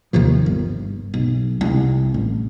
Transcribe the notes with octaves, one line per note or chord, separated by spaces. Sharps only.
D#2 C3 D#3 F3
G1
B1
C2
A1